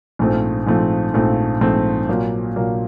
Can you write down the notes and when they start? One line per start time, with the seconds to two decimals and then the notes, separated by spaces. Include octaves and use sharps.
0.19 A#1 G#2 F3 A3 C4
0.66 A#1 G#2 F3 A3 C4
1.14 A#1 G#2 F3 A3 C4
1.60 A#1 G#2 F3 A3 C4
2.09 A#2 F#3 A#3
2.56 A#2 F#3 A#3